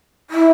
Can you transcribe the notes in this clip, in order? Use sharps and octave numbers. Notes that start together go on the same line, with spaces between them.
E4